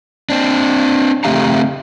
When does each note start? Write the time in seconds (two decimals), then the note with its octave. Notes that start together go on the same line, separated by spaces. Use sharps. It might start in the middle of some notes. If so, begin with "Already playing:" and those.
0.30 C4 D4
1.24 C#3 A3 C4 G4 F5 A#5